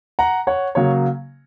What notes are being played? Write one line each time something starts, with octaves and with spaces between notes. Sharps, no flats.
F#5 A#5
C#5 F#5
C#3 F#3 A#3 C#5